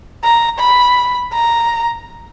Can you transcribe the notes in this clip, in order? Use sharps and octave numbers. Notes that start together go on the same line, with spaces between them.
A#5
B5
A#5